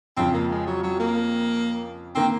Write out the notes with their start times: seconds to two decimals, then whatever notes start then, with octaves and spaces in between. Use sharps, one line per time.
0.17 F2 C#3 F3 C4
0.34 A#3
0.51 G#3
0.67 F#3
0.84 F#3
1.00 A#3
2.15 D#3 A#3 C4